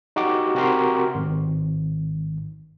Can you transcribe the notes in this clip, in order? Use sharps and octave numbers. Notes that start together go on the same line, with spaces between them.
D#4 F#4 G4 D6
C3 F#4 G4 A#4 C6
G#1